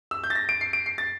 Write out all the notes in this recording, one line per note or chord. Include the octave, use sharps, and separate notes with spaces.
E6
G6
A6
A#6
D7
C7
D7
C7
A6